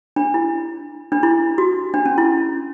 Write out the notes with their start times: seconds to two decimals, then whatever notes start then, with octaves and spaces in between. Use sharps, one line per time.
0.16 D4
0.34 E4
1.12 D4
1.23 E4
1.58 F#4
1.94 D4
2.05 C#4
2.18 E4